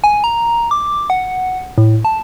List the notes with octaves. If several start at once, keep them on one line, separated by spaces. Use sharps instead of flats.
G#5
A#5
D6
F#5
A2
A5